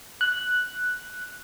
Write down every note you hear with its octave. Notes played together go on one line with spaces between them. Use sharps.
F#6